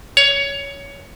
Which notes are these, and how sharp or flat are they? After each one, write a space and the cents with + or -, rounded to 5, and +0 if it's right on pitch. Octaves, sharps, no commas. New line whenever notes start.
C#5 +15